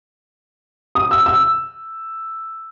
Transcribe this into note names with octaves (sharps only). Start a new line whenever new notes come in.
D#6
E6
E6